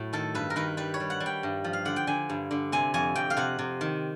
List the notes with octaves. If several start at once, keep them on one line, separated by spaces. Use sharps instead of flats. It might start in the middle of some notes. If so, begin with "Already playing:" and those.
Already playing: A2 F#3 A3
D#3 A4
G2 B4
A#4
D#3 B4
G3 B4
C#5
G3
F#5
G3
G5
G2
F3
F5
D3 F#5
G5
D3 G#5
G2
D3
C3 G#5
F2 G#5
F2 G5
F5
C3 F#5
C3
D#3